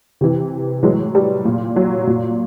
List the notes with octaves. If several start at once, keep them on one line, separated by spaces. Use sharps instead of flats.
C3 E3
A2 E3 F#3 G#3
G3
A#2
F#3
A#2